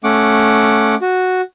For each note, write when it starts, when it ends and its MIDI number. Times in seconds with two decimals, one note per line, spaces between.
0.04 0.95 57
0.04 0.95 61
0.04 0.95 78
0.04 0.95 86
1.01 1.41 66